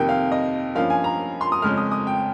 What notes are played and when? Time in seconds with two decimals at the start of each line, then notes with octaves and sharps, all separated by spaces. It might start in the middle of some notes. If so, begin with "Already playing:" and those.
Already playing: F2 C3 D#3 A#3 G5
0.09 F5
0.32 D#5
0.75 G2 F3 A#3 C#4 F5
0.90 G#5
1.04 A#5
1.41 C6
1.52 D#6
1.62 F2 C#3 G#3 C#4 F6
1.77 D#6
1.92 D#6
2.07 G5